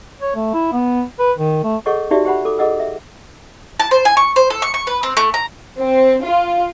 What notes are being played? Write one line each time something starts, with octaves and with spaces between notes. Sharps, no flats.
C#5
A3
E4
B3
B4
D#3
A3
G#4 A4 C#5 D#5 F#5 C#6
D#4 F#4 G4 D5 E5
G4 C5 F#5 B5
A4 D6
G#4 A4 D#5 F#5 E6
E5
A5
C5
G#5
C#6
C5
A4
C#6
C#6
B4
C4
A3
A#5
C4
F4